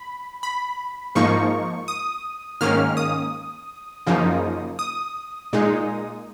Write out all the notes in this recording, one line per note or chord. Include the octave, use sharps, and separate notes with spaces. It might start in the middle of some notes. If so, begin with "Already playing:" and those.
Already playing: B5
B5
G#2 F3 A#3 D#4 C#6
D#6
G#2 D#3 A#3 C#4 F6
D#6
F#2 C#3 F3 A#3 D#4
D#6
A#2 G#3 D#4